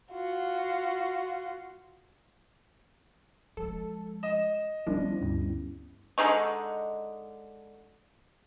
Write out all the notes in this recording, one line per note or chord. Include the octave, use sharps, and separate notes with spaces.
F4 F#4
F3 G#3 A4
D#5 E7
D#3 F3 G3 B3 C#4 D4 E4
D2 G2
D3 G#3 D#4 C#6